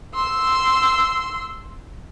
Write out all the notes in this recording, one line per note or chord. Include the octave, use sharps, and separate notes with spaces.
C6 E6